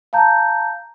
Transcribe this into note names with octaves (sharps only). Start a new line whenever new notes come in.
F5 A5 A#5 G6